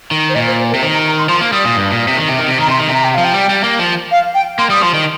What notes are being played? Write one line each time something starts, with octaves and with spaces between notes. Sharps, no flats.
D#3
C5
A#2 D#5
C5
C5
A#4
C3
D#3 C5
A#5
A#5
C6
F3 C6
A#3
G3 D#6
A#2
G2
A#2
C3
D#3
C3
D#3
C3
D#3 A#5
C3 C6
D#3
C3
A#5
G5
F3 F5
G5
G3
G3
A#3
F3
F5
G5
A#3 C6
G3 D#6
F3 C6
D#3